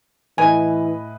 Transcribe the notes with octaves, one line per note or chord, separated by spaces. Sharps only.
A2 E3 B4 D#5 G#5